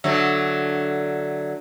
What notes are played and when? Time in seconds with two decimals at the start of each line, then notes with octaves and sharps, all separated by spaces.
0.04 D3 F#3 A3